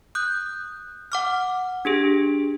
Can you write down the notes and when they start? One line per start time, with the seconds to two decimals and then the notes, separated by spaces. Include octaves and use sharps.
0.15 D#6 F#6 G6
1.12 F#5 D6 F6
1.85 D4 G4 G#4